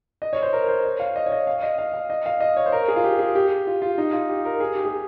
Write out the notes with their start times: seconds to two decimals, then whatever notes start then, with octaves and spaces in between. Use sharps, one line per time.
0.22 D#5
0.33 C#5
0.43 C5
0.53 A#4
0.68 C5
0.85 C#5
1.00 F5
1.16 D#5
1.26 C#5
1.32 D#5
1.47 F5
1.62 D#5
1.78 F5
1.94 F5
2.10 D#5
2.26 F5
2.40 D#5
2.57 C#5
2.66 C5
2.72 A#4
2.88 G#4
2.96 F4
3.04 G4
3.19 G#4
3.35 G4
3.67 F4
3.82 F4
3.98 D#4
4.13 F4
4.29 G4
4.45 A#4
4.60 G#4
4.75 G4
4.85 G#4